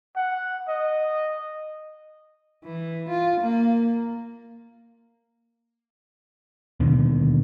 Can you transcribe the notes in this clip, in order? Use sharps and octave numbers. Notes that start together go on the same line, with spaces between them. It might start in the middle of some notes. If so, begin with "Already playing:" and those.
F#5
D#5
E3
F4
A#3
D#2 B2 D3 D#3